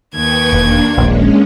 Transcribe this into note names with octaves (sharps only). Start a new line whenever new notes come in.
D#2 B4 G5 C#6 G#6
E1 A#3 D4
D#1 A#1 G#3 C#4